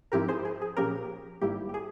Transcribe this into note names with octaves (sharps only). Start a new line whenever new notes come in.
G#2 F3 C4 E4 G4 A#4
G#4 C5
G#4
G#4
A#2 F3 A#3 C#4 G4 A#4
G#1 G#2 G3 A#3 E4 G4
G4
G#4